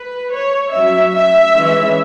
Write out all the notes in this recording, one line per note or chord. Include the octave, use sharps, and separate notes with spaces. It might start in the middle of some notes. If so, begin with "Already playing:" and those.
Already playing: B4
C#5
F#3 C#4 E5
E5
E3 G#3 C#4